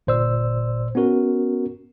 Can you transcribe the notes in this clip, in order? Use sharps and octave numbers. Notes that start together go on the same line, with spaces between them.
G1 A#2 C5 D5 E6
B3 C#4 F#4 A#4